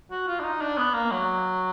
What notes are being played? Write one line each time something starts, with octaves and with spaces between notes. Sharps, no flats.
F#4
F4
D4
D#4
D4
B3
A#3
F#3